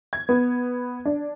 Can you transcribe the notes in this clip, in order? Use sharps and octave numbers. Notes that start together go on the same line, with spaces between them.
G#6
B3
D4